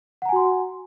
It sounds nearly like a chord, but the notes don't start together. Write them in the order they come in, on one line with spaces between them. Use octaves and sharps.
F#5 A#5 G#5 F#4 C6